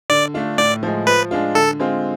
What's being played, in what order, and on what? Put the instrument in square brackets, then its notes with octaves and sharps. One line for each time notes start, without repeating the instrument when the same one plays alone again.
[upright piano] D3 [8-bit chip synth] D5
[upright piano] A3 D4 F4
[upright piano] A2 [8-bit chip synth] D5
[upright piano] F3 G#3
[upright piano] F3 [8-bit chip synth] B4
[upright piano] G#3 D4 F4
[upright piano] D3 [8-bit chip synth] A4
[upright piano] G#3 C4 F4